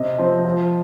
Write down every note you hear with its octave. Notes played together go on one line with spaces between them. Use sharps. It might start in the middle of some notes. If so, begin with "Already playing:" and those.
Already playing: C3 D#5
F3 C4
F3